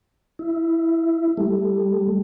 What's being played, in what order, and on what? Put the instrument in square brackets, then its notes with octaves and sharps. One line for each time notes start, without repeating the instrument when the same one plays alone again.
[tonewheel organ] E4
G3 A3